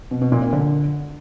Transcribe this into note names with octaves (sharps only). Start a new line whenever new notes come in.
B2
B2
A#2
A#2
D3